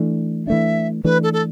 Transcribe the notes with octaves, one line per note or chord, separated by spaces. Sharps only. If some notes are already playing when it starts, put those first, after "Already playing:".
Already playing: E3 A3 D4
E3 A3 D4 E5
E3 A3 D4 B4
A4
A4